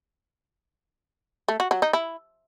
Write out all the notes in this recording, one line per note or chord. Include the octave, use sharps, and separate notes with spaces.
A3
F#4
F#3
D#4
E4